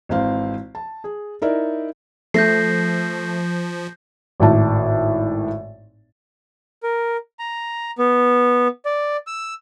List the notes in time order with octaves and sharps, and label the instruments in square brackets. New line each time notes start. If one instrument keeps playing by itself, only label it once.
[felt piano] G#1 E3 C4 F5
A5
G#4
D#4 E4 A#4 D5 E5
[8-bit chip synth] F3 [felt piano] A3 [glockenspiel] G6 A#6 C7
[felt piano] G#1 A2 A5
[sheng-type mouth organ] A#4
A#5
B3
D5
E6